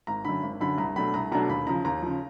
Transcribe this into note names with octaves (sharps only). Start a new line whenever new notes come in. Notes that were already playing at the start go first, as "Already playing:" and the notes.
G#1 A#5
F#2 D3 B5
G#1
F#2 D3 B5
C2 A#5
B2 F#3 A3 D4 B5
C2 A#5
B2 F#3 A3 D4 A#5
D#2 B5
C#3 F3 A#5
D#2 A#5
C#3 F3